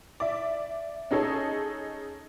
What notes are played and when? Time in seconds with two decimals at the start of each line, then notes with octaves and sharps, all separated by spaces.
0.20 D5 E5
1.11 C#4 D#4 G#4 A4 C#5